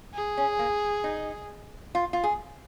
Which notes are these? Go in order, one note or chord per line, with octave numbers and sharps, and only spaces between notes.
G#4
C#4
A#3
D#4
F4
F4
G#4